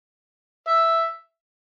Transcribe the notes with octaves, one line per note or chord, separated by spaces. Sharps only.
E5